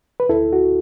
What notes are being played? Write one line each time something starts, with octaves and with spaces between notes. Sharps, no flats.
B4
D2 E4 A4
F#4